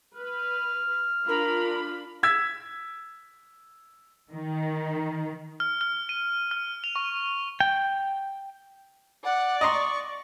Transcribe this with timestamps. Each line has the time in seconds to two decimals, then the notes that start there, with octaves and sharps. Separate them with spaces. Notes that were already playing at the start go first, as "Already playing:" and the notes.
0.16 B4 F6
1.28 D4 F4 A#4 B5
2.23 E6 G#6 B6
4.32 D#3
5.60 F6
5.81 F6
6.09 D#7
6.51 F6
6.84 F7
6.96 C#6
7.60 G5
9.24 D5 F#5
9.61 D#5 A#5 C6 C#6